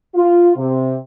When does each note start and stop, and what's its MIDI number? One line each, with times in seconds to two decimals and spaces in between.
0.15 0.50 65
0.56 0.95 48